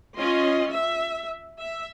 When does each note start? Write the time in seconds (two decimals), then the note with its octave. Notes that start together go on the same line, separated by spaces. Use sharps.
0.17 C#4 F4 D#5 C6
0.71 E5
1.59 E5